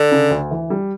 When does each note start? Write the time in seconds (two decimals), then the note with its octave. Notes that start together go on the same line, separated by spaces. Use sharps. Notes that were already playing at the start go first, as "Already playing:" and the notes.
Already playing: D3
0.12 C#3
0.31 D2
0.51 E3
0.70 G3